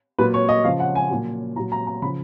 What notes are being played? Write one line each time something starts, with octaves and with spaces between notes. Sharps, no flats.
A#2 F#3 B4
C#5
D#5
C#3 F3 F5
F#5
G#5
A#2 F#3
A#2 F#3 A#5
A#5
A#5
C#3 F3 B5